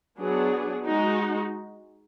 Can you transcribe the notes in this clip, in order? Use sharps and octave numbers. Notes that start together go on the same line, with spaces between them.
F#3 B3 D4 G#4
G#3 D#4 F#4